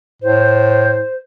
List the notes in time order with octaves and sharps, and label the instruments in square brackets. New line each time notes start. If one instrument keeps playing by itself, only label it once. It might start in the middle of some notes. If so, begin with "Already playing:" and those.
[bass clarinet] A2 [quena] C5